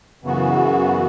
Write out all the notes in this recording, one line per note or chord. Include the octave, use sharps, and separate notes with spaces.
F#2 C#3 E3 B3 F#4